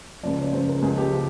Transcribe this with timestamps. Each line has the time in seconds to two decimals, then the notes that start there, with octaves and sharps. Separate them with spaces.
0.23 C#2 C#3 F3 D5
0.39 C#5
0.53 C#2 C#3 F3 C5
0.69 A#4
0.82 C#2 C#3 F3 G#4
0.98 G4
1.12 C#3 F3